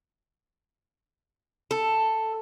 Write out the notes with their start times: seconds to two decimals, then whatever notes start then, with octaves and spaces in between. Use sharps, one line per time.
1.71 A4